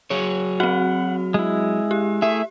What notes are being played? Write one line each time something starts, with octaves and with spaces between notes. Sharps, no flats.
F#3 G#4 C#5
C4 F#4 F#5
G#3 E4
G4
A3 E4 G#4 E5